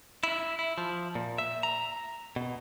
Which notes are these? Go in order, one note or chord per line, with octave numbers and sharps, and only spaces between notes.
E4
E4
F3
A#2
E5
A#5
B2